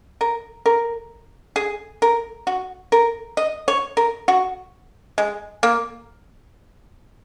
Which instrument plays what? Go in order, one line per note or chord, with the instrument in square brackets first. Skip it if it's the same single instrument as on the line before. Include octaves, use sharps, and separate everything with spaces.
[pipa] A#4
A#4
G#4
A#4
F#4
A#4
D#5
C#5
A#4
F#4
G#3
A#3